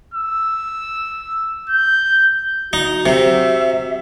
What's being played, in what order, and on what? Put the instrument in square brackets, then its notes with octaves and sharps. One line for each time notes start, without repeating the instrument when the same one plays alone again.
[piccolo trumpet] E6
G6
[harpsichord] D#4 [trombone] F#4
[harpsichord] C3 [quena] E5